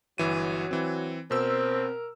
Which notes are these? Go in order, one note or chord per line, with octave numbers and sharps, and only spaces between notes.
G1 E3 F#3 D#7
E3 C4
B2 C4 A#4 E6